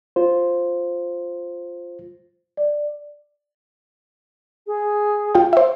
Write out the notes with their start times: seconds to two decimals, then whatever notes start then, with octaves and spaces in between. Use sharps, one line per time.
0.16 F4 C5
2.57 D5
4.67 G#4
5.35 F4 G5
5.53 C5 E5